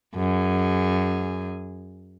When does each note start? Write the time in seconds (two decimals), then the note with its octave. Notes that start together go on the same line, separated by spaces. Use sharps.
0.17 F#2 G#4